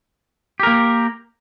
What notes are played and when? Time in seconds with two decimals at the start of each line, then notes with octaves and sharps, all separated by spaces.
0.60 G4
0.63 A#4
0.67 A#3